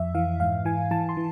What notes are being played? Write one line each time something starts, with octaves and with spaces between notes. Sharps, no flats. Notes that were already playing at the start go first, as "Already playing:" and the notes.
Already playing: F2 E5
E3 F5
G#2 F5
E3 G#5
E3 A5
C6
E3